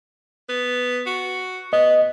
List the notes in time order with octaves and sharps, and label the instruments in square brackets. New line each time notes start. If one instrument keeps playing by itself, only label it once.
[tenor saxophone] B3
F#4
[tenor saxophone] B3 [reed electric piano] D#5